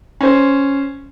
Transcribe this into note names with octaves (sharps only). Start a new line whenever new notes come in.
C#4 C5